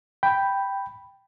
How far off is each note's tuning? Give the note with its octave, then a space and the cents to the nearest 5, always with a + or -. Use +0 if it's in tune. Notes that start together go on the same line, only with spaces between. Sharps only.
G5 +0 B5 +0